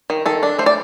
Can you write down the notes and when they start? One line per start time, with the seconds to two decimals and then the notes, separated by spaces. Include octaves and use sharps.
0.10 D#3
0.26 D#3 A4
0.43 D4
0.58 A3 C5
0.66 D5